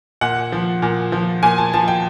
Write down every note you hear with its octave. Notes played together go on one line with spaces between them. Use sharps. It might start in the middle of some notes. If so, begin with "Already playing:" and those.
A#2 F#5
F3
A#2
F3
A#2 G#5
A5
F3 A5
G5